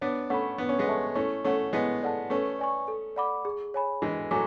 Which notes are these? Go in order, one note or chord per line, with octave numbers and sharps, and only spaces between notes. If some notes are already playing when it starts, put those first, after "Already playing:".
B3 D4 C#5
A3 C#4 F#5 B5
B3 D4
C#4
G#3 B3
A4 E5 A5 C#6
A3 C#4 E4
A3 C#4 A4 C#5 F#5 C#6
G#3 B3 E4
A4 D5 F#5 A5
A3 C#4 B4
D5 G#5 C#6
A4
D5 F#5 B5 D6
G#4
C#5 G#5 B5
E3 G#3 D4
F#3 A3 G#5 D6